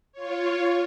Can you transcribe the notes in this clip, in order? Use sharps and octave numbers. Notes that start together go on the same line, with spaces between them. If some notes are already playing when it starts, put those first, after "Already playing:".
F4 C#5